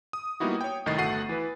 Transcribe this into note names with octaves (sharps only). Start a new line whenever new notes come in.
D#6
G3 A#3 B3 D#4 E4 F#4
C#5 G5
C2 A2 D#3 D#5 A6 C7
G1 A3 F#4 F#5 C7 D#7
E3 B4